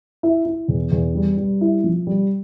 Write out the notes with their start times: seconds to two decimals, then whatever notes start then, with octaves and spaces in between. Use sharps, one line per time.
0.23 E4
0.45 E4
0.68 E2
0.92 E2
1.15 G3
1.37 G3
1.61 E4
1.84 F3
2.07 G3